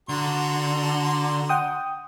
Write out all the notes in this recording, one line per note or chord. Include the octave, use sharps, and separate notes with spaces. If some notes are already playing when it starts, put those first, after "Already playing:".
D3 F#4 A#5 C6
F#5 G5 D#6